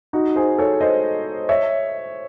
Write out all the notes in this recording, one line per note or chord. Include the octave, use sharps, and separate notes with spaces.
D#4 F#4
G#4 C5
A4 C#5
C5 D#5
C#5 E5